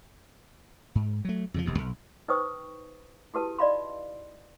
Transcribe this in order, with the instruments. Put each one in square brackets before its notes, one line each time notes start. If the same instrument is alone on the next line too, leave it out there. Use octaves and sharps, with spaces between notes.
[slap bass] G#2
F#3 A3
F2 C#3 F3
E1 D#2 C3
B1
[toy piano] D#4 B4 C5 G5 C#6 D#6
E4 F#4 G4 A4 B4 A5
D#4 D5 D#5 F5 B5 C6